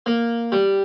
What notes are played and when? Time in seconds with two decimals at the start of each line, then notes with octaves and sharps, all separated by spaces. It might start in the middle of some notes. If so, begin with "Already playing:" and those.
0.06 A#3
0.52 G3